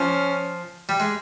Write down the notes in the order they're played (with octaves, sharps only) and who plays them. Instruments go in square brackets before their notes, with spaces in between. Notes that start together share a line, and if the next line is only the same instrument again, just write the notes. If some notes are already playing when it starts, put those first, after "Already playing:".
Already playing: [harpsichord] F3 [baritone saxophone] C#4
[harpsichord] G3
G#3